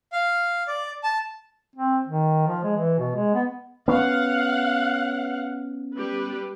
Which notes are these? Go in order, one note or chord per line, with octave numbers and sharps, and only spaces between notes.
F5
D5
A5
C4
D#3
F3
G#3
E3
B2
G#3
B3
B3 C#4 F5 F#5
G3 G4 B4